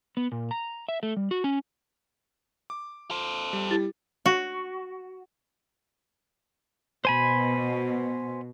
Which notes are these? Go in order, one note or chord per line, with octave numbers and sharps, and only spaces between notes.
B3
A#2
A#5
E5
A3
G3
F#4
C#4
D6
A4 C5
G3
E4 G4 A6
F#4
B2 C5 G#5 B5